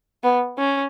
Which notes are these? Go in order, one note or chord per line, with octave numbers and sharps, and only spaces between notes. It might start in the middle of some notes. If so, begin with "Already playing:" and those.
B3
C#4